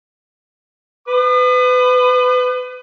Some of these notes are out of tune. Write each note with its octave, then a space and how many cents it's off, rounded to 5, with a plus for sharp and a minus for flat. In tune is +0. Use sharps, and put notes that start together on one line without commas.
B4 +30 D#6 -40